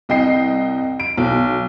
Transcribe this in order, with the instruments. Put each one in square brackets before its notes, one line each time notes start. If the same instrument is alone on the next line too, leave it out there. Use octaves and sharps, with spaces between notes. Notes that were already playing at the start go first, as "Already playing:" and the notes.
[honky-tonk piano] C2 D#5 G5 C7
D7
B1